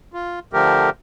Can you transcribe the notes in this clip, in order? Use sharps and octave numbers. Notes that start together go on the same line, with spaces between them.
F4
D3 F3 A3 G4 A#4